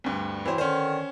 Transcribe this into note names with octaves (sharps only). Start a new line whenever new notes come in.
D2 G2
E3 F#3 C4 E4 C5
D3 D#3 C#4 C5